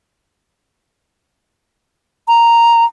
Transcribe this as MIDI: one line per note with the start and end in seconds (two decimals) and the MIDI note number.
2.28 2.84 82